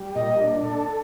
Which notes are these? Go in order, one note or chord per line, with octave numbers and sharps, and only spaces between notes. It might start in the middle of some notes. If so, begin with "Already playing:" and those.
Already playing: G3
A#2 D#5
D4
A4